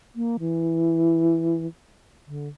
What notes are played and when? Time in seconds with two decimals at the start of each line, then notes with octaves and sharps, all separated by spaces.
0.16 A#3
0.40 E3
2.27 D3